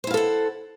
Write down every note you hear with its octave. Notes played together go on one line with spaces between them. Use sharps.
E4 A4 C5 F5 F#5